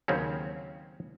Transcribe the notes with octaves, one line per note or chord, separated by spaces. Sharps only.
D#2 C#3 F#3 A#3 C4 C#4